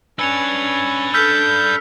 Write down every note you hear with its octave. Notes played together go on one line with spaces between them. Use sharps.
C#4 D4 B4 G#5 E6 C#7 F7
A4 E6 F6 G6 B6